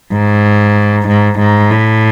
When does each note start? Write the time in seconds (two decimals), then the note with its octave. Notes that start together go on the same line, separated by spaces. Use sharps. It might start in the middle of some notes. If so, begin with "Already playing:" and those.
0.12 G#2
1.07 G#2
1.38 G#2
1.71 A2